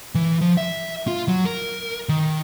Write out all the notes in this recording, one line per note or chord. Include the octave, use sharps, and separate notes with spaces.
E3
F3
E5
F4
F#3
A#4
D#3